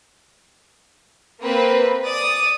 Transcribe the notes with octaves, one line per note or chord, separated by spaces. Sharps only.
A#3 C4 B4
D5 D#6